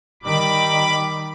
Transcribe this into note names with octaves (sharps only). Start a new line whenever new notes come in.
D#3 G3 B5 D6